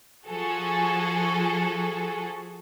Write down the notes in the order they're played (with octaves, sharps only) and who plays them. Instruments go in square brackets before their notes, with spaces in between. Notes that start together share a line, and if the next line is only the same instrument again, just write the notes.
[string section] F3 F#4 G#4 A4